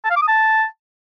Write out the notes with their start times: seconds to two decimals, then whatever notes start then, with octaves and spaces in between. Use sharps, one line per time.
0.05 A5
0.11 F5
0.16 D6
0.22 D#6
0.28 A5